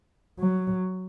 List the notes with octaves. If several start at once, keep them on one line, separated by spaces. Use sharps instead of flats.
F#3